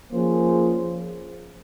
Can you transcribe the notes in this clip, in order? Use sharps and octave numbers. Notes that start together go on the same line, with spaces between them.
F3 A#3 C#4 G#4 C5